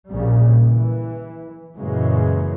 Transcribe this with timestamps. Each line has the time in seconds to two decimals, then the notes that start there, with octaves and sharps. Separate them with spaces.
0.12 A#1 A#2 C#3 G3
0.63 E3
1.78 F#2 A#2 C#3 E3 F#3 G#3